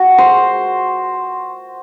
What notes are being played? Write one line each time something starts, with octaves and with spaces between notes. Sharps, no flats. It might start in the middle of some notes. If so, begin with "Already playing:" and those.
Already playing: F#4
C5